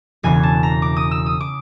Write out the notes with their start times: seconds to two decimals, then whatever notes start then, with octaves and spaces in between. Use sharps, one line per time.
0.23 E1 E2 C#3 E3 G#5
0.43 A5
0.63 A#5
0.82 D6
0.96 D#6
1.11 E6
1.26 D#6
1.41 D6